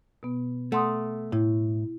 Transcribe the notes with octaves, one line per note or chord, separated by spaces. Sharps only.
B2 B3
A3 F#5 C6 D#6
A2 E4